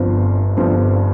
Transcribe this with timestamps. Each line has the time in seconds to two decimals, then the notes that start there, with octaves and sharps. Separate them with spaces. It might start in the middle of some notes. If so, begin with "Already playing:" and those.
Already playing: G1 G2 F3 C4 F4
0.57 G1 G2 F3 C4 F4